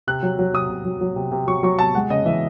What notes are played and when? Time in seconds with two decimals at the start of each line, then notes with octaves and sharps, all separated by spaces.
0.07 C3 F#6
0.23 F#3
0.39 F#3
0.53 C3 D#6
0.69 C3
0.85 F#3
1.01 F#3
1.16 C3
1.32 C3
1.47 F#3 C#6
1.63 F#3 C#6
1.79 C3 A5
1.94 G#3 F#5
2.10 C#3 D#5
2.25 E3 E5